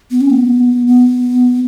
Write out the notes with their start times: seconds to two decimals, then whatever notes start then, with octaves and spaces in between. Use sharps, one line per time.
0.11 B3
0.21 C#4
0.30 A#3
0.39 B3
0.87 B3